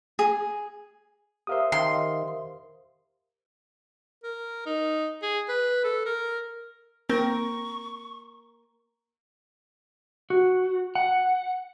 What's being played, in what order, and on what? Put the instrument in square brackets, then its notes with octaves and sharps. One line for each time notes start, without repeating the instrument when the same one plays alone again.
[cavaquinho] G#4
[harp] G4 A#4 C5 [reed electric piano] E5 F5 D#6
[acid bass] D#3 [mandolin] C6
[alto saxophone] A#4
D#4
G#4
B4
A4
A#4
[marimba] A#3 [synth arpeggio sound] C4 [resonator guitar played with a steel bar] A#4 [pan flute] C#6
[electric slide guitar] F#4
F#5